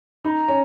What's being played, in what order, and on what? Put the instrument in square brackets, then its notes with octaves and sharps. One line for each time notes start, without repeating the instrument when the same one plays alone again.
[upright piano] D#4 [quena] A#5 B5
[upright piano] C#4